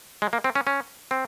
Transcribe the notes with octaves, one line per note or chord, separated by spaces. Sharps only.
G#3
A#3
C4
C#4
C#4
C4